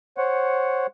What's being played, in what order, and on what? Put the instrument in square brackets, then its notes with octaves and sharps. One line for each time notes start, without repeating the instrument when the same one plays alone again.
[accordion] C5 C#5 F#5